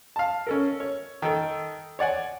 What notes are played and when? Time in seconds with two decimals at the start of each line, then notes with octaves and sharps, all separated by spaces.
0.16 F5 A5
0.47 C#4 A4 A#4
0.80 C#5
1.22 D#3 A4
1.99 C#5 D5 F#5 G#5